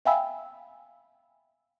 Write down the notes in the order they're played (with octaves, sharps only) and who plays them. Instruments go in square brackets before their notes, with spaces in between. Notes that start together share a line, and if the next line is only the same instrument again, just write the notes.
[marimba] E5 F5 G5 G#5 B5 E6